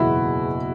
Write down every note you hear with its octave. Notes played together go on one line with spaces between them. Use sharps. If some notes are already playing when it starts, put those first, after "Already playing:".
Already playing: F#1 E2 B2 B3 E4 F#4 G#4